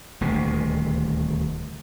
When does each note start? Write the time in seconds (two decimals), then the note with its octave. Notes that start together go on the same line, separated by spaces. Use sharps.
0.21 D#1 D2 C3